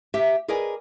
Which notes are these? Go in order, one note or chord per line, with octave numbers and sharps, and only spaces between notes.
G4 E5
G#4 A#4 B4 D5 D#5 G#5